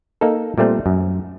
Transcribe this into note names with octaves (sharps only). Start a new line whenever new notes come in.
A#3 D#4 A4
A#2 G3 A3 C4
F#2